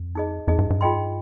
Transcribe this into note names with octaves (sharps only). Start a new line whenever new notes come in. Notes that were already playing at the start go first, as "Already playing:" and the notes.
Already playing: F2
D#4 G#4 D#5
F2 D#4 G#4 D#5
G2
G2
F4 G#4 D#5 G5 C6